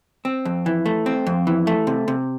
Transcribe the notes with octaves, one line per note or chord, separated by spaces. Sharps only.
C4
F2
E3
A3
C4
F2
E3
A3
C3
C3